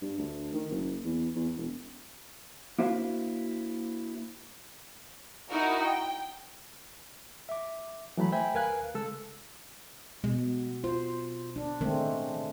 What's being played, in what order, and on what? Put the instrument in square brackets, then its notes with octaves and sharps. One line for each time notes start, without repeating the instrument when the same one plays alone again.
[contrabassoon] G2
D2
D#3
F#1
E2
E2
E1
[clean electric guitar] A#3 D4 E4 F#4 C5 F5
[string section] D#4 E4 F#4 A#4
G5
[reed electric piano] E5 D6
E3 F#3 A3 B5
C5 E5 G5 G#5 B5
D#2 A#4 B4 F5 G#5 F#6
C#3 G#3 A4 E6
[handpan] B2 [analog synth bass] G#3
[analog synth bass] F4 [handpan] C5
[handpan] D4
[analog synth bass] D#3 [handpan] G#3 A3 C4